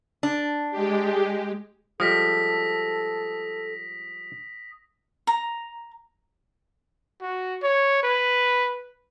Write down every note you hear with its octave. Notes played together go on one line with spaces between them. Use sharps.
D4
G#3 G4
F3 G3 G#3 A4 D#6 A#6 B6
A#5
F#4
C#5
B4